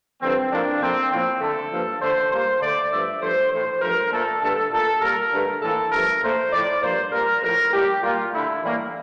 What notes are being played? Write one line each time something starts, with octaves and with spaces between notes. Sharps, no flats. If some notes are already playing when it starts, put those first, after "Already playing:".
G2 D3 F3 C4
A2 F3 A#3 D4
A#2 F3 A3 C4
A2 F3 A#3 C4
D3 A3 A4
G2 F3 A#3
D3 A3 C5
A#2 G3 A#3 C5
D3 A3 D5
G2 F3 A3 E5
G2 F3 A3 C5
A2 E3 A3 C5
G2 F3 A3 A#4
A#2 A3 A4
G2 D3 A3 A4
A#2 A3 A4
A#2 G3 A#3 A#4
G2 D3 A3
A2 E3 A#3 A4
G2 F3 A3 A#4
A#2 A3 C5
A2 F3 A3 D5
G2 F3 A#3 C5
A#2 G3 A#3 A#4
A2 F3 A3 A#4
A2 G3 A#3 G4
A#2 G3 A#3 F4
D3 A3 E4
A2 E3 G3 A#3